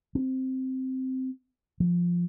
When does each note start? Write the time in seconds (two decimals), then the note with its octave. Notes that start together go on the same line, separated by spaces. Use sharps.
0.15 C4
1.80 F3